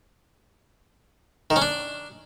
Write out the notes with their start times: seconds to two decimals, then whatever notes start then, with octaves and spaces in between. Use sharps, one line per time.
1.50 D#3
1.56 C#4
1.62 D4